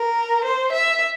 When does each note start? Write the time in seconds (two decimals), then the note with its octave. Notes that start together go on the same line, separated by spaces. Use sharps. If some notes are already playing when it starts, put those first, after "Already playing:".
Already playing: A#4
0.44 C5
0.72 E5